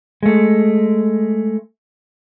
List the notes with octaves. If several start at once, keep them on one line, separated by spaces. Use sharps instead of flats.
G#3 A3